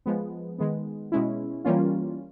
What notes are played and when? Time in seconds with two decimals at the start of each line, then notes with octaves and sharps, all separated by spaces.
0.06 F3 G#3 B3
0.58 D#3 G#3 B3
1.12 B2 G#3 C#4 E4
1.64 E3 G3 A#3 C#4 F4